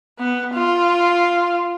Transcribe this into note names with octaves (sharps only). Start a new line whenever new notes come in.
B3
F4